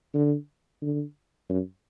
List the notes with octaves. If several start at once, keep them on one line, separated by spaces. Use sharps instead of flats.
D3
D3
F#2